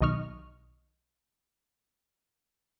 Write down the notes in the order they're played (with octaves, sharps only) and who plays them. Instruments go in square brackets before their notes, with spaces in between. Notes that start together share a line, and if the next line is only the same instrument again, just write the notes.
[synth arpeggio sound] B1 D#3 D#5 C#6 F6